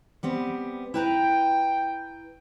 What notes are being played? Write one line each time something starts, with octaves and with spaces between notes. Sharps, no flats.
G3 B3 C4
E4 B4 G5 A#5